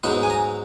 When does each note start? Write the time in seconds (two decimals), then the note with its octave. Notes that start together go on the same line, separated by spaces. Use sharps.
0.03 G#2 F#3 B3 B4
0.23 G#5
0.30 A#5